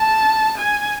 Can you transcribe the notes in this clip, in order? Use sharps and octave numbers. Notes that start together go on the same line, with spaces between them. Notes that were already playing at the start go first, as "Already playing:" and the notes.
Already playing: A5
G#5